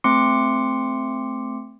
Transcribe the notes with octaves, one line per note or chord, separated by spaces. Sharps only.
A3 C4 C6 D6 C#7